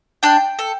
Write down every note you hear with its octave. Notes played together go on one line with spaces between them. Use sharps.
D4 G5
A4